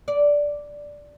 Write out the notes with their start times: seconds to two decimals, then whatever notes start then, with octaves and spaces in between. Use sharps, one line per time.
0.08 D5